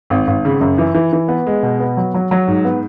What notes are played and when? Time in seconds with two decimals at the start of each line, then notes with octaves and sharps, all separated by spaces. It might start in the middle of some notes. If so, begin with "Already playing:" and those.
0.10 G#1
0.27 G#1
0.45 C#3
0.61 F#2
0.78 E3
0.95 E3
1.13 E3
1.28 B3
1.47 G#3
1.63 B2
1.80 B3
1.97 F#3
2.14 F#3
2.31 F#3
2.48 G#2
2.65 B3